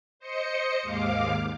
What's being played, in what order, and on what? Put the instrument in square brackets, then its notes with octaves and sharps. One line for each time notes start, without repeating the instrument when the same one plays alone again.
[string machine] C5 D#5 C#7
D#2 G#2 F5 D6